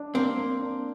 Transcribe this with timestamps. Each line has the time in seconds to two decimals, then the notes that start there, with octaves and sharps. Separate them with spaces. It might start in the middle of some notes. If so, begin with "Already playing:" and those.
Already playing: D4
0.14 A#3 C4
0.37 A#3
0.61 D4